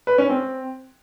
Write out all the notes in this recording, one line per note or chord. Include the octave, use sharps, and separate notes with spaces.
B4
C#4
C4